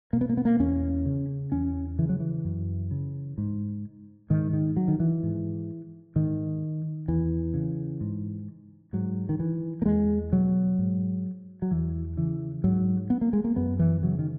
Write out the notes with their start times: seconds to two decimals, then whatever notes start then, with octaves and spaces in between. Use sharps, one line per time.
0.13 B2 A#3
0.21 B3
0.29 A#3
0.37 B3
0.45 A#3
0.60 E2 C#4
1.05 C#3
1.52 E2 C#4
1.99 C#3 E3
2.09 F#3
2.20 E3
2.45 F#2
2.91 C#3
3.38 G#2
4.30 G#2 D#3
4.53 D#3
4.77 F#3
4.88 D#3
5.00 E3
5.23 G#2
6.15 G#2 D#3
7.08 E2 E3
7.54 C#3
8.01 G#2
8.93 G#2 F#3
9.29 D#3
9.40 E3
9.82 A#3
9.85 E2 G#3
10.32 B2 F#3
10.79 G#2
11.62 F#3
11.71 E2 E3
12.17 C#3 E3
12.64 G#2 F#3
13.10 B3
13.21 A#3
13.33 G#3
13.44 A#3
13.56 F#2 B3
13.79 E3
14.03 C#3 F#3
14.19 D#3